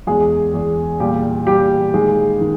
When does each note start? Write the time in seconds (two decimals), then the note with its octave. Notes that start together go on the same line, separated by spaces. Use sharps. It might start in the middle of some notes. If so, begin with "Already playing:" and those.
0.07 E2 G#3 G#4
0.54 E2
1.00 A#2 G3 G4
1.47 A#2 G3 G4
1.94 D#3 G#3 G#4
2.41 D#3